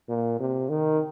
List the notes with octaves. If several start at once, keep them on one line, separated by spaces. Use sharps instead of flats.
A#2
C3
D#3